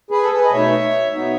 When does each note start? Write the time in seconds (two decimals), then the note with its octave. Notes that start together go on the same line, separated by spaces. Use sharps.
0.11 G#4 B4
0.23 A4
0.31 G#4 B4
0.45 D#5
0.52 B2 A3 D#4 C#5 E5
1.13 B2 F#3 B3 D#4 C#5 E5